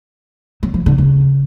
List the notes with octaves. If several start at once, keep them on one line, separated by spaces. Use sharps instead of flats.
F#3
F3
D3
C#3